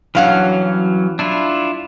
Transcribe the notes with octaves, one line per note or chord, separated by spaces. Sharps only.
G2 E3 F#3 C#4 F5 F#5
D4 E4 F4